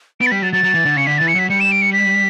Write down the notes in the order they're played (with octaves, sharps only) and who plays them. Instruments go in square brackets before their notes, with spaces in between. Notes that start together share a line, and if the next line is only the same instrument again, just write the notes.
[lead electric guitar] B3 [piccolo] D7
[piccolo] A6
[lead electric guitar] G3 [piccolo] B6
[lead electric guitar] F#3 [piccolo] A6
[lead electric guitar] F#3 [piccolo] A6
[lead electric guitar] F#3
E3
D3
[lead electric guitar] C#3 [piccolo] C#7
[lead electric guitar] D3 [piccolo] B6
[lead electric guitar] E3 [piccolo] A6
[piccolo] C#7
[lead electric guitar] F#3 [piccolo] B6
[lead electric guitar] G3 [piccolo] C#7
[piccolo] E7
D7
C#7
B6